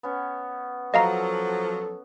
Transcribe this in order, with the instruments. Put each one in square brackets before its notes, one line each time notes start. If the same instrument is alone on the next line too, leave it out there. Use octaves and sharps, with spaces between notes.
[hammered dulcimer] B3 C#4
[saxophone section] F3 F#3 [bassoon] A4 [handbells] D#5 F5 A#5